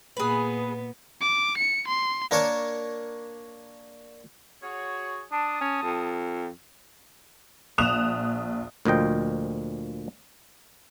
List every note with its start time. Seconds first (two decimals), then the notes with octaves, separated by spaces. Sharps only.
0.17 A#2 B3 G#4 B4
1.21 D6
1.58 C#7
1.88 C6
2.31 A#3 D4 A#4 C#5 A5
4.63 F#4 G#4 C#5
5.32 D4 A5 D#6
5.61 C#4
5.82 F2
7.78 A#1 D#6 F#6 E7 F7
8.85 D2 A#2 F3 D#5 G5